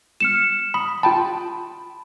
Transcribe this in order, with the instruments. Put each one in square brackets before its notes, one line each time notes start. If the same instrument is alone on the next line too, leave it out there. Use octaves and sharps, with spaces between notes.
[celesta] F6 C#7 E7
[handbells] B5 [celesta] D#6
[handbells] F4 G5 A5 [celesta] B5